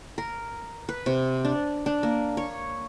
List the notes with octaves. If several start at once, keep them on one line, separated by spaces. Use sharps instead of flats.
A#4
B4
C3
D4
D4
A#3
C#5